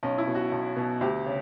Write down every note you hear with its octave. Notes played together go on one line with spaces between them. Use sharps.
B1 C#4
E4
B2
F#4
B1
B2
D2 G4
C#3